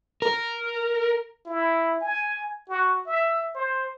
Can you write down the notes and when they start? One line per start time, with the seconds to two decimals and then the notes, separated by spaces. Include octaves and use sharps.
0.22 A#4
1.46 E4
2.01 G#5
2.69 F#4
3.07 E5
3.55 C5